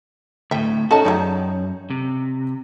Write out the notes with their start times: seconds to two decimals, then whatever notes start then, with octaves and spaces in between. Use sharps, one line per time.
0.51 D2 A2 E5 G5
0.91 C#4 D#4 F#4 A4 D#5 A5
1.05 F#2 F#3 D#4 G#4 C#5 D5 G5
1.90 C3